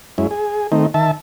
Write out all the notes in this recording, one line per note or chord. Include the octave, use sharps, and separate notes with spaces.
F#2 G#3 C#4 E4
G#4
D#3 A3 C4 D#4
D#3 E5 A5